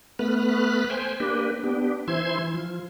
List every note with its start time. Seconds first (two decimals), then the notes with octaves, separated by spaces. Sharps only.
0.19 A3 B3 B4 B5 F6 F#6
0.90 C5 G5 G#5
1.20 A#3 D4 G4 B4
1.64 B3 D4 G4
2.08 E3 E4 C5 C6 G#6
2.54 F3